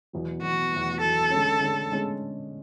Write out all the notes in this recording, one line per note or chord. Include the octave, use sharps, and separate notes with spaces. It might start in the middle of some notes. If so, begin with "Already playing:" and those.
E2 B2 F#3
E2 B2 F#3 F#4
E2 B2 F#3
E2 B2 F#3 A4
D3 G#3 C#4
D3 G#3 C#4
D3 G#3 C#4